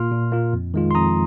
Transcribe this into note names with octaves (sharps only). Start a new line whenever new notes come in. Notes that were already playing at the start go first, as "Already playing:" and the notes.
Already playing: A#2 A#3 F4 C6 F6
A#2
A#3 F4
F2
D#3 G#3 F4
C6
F2 A#5 D#6